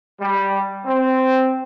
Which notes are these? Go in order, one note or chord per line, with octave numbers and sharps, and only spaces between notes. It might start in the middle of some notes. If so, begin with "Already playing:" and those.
G3
C4